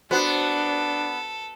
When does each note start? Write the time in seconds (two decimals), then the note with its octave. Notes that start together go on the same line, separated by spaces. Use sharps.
0.11 B3 D4 F#4 A4 C5